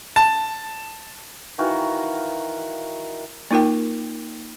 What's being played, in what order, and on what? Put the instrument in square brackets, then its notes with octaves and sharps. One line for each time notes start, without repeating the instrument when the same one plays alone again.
[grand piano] A5
[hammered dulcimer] D#3 E3 F#4 F5
[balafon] A#3 D#4 F4 A#4 G5